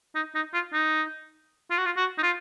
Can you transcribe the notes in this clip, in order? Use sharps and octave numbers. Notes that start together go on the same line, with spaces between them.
D#4
D#4
F4
D#4
F4
F#4
F4
F#4
D#4
F4